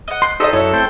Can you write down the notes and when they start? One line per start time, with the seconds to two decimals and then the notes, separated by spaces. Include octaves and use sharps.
0.08 D#5 F#5
0.22 C6
0.40 D#4 G4 A4 C5 D5 D#5
0.53 F#2 E4 C#5
0.73 A3 C4 G5